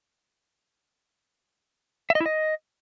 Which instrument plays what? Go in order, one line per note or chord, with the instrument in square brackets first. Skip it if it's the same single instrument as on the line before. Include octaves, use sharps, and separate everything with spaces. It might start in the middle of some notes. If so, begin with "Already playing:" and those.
[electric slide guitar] E5
D#5
E4
D#5